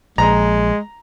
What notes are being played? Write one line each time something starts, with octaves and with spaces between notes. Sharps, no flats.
A#1 G#3 A#5